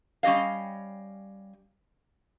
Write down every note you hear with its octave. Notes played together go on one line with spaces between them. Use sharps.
G3 C#4 G4 D#5 F5